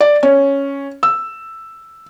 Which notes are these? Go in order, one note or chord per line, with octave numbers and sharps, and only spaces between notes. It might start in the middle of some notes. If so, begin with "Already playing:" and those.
D5
C#4
E6